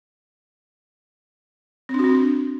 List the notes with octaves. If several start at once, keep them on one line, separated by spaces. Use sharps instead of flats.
C4
D4
F#4
C4
D4